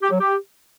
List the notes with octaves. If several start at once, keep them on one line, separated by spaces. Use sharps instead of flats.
G4
F#3
G4